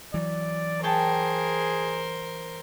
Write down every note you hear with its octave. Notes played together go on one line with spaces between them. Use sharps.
E3 F#3 D5
G#4 A#4 C5 C#5 G5 A5